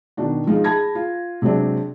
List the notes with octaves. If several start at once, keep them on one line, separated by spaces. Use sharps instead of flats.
B2 D#3 D4 F#4
F3 G#3 D#4 F4
G#4 A5 B5 G#6 A#6
F4
C3 F#3 G#3 C4 D4